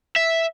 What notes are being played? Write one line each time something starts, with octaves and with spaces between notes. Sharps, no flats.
E5